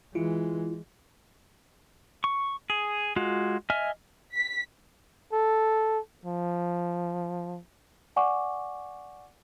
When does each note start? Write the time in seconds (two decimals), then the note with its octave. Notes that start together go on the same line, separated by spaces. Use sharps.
0.15 E3 G#3 E4 F4
2.24 C#6
2.70 G#4
3.16 G#3 F4 F#4
3.70 D#5 E5 G#5 F6
4.34 B6
5.33 A4
6.25 F3
8.16 D5 F#5 G#5 C#6 D6